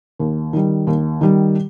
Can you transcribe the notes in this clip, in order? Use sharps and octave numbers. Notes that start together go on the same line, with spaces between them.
D#2
D#3 G3
D#2
D#3 G3